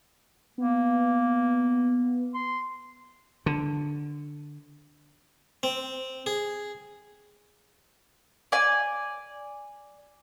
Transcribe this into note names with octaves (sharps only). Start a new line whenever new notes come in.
A#3 B3
C6
D3
C4
G#4
D5 G#5